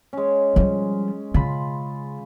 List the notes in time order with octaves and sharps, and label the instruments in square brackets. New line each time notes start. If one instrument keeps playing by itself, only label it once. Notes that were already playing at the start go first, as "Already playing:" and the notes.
[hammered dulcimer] G#3 C#4
[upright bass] F3 G3
[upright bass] C#3 [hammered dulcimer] F4 B5